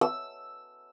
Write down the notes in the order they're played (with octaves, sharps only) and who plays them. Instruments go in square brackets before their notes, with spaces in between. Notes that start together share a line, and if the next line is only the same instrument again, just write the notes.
[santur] E6